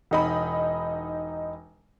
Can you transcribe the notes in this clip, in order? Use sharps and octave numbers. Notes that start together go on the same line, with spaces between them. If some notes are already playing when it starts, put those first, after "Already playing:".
E1 D#4 B5